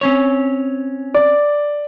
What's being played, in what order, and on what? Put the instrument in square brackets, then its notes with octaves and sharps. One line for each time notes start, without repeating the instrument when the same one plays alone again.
[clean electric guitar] C4 C#4 C#5
[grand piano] D5